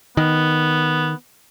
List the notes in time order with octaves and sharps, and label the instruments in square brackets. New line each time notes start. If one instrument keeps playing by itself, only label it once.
[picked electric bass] D#3 [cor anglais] B3